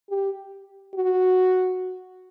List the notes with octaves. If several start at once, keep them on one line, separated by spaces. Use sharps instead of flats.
G4
F#4